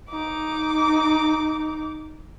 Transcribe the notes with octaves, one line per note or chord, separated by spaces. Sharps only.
D#4 D6